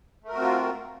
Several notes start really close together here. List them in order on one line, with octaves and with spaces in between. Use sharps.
A3 A#4 F#4 C4 F4